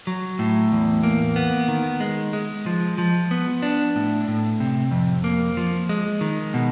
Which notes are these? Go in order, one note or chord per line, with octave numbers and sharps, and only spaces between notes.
F#3
A2
E2
A#3
B3
D#3
G#3
G#3
F3
F3
B3
D4
A2
A2
C3
F2
A#3
F3
G#3
D#3
B2